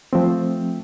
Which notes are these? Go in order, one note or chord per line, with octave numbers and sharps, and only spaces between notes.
F3 A3 C4